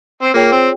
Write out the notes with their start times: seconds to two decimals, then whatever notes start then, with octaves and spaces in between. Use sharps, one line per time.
0.23 C4
0.34 A#3 F4 G#4 C#5 G5
0.52 C4